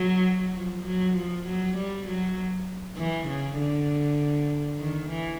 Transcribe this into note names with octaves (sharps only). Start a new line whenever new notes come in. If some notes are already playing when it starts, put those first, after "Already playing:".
Already playing: F#3
F3
F#3
F3
F#3
G3
F#3
E3
C#3
D3
D#3
E3